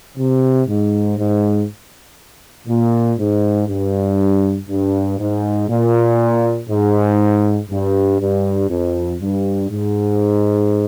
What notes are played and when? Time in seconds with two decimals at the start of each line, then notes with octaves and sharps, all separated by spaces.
0.18 C3
0.68 G#2
1.18 G#2
2.68 A#2
3.19 G#2
3.68 G2
4.69 G2
5.19 G#2
5.69 A#2
6.69 G#2
7.70 G2
8.20 G2
8.70 F2
9.21 G2
9.70 G#2